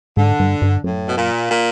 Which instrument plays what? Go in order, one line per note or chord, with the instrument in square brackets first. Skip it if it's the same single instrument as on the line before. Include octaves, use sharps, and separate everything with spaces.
[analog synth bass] G#2 [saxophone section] D3
[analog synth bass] G2
G2
[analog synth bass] F#2 [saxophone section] A2
[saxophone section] B2
A#2
A#2